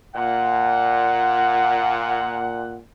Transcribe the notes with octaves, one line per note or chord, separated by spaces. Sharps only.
A#2 F#5